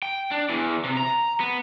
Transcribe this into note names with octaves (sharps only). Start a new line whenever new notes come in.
G5
D4
E2 E3
C3
A#5
B3